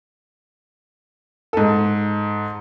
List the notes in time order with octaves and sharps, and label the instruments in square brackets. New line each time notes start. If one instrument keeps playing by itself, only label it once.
[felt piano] G#2 A4